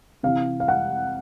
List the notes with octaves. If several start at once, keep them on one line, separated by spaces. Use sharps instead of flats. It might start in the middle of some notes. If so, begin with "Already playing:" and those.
C3 E3 F5
F5
F#5